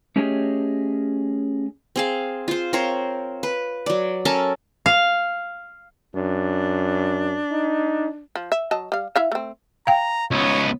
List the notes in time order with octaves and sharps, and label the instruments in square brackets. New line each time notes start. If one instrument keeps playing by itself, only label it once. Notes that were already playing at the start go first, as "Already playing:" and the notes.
[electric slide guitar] A3 C#4 G4 G#4 C#5 D#5
[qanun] C4 G#4 F5
F4 C5
C4 A#4 C5 C#5
B4
F#3 D5
C#4 A4 A#4 A5
[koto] F5
[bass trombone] F#2 [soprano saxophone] D4
[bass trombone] D#4
[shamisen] F3
E5
F#3 D#5 A5
G3 F5
E4 E5 F5
A3 C4
[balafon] F5 G5 [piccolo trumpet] A#5
[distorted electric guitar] C#2 B3 [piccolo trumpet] C#5